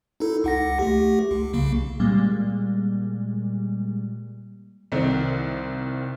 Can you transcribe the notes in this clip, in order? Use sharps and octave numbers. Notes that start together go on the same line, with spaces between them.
D#4 E4 A4
C#2 F#5 A#6
A3 G4
C#2
C2 C#3 A#3
A#2 G3 G#3 A#3
C2 D#3 C4